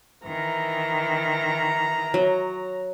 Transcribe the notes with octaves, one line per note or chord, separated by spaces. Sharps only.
D#3 E3 A#5
F#3